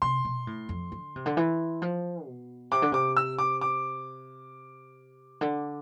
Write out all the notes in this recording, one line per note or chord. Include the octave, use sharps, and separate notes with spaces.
C3 C6
B2
A2
F2
D3
C3
D3
E3
F3
B2
C3 D6
D3
C3 D6
E6
D6
D6
D3